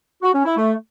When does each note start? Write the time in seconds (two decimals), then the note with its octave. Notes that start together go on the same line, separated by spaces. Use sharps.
0.22 F#4
0.33 C#4
0.45 E4
0.57 A3